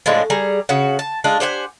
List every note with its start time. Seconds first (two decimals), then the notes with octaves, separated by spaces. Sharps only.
0.06 A2 F3 G#3 D4
0.30 G3 G#4 A#5
0.69 C#3 F#4
0.99 A5
1.24 G#3 D4 F4
1.40 G4 C5 F#5 G#5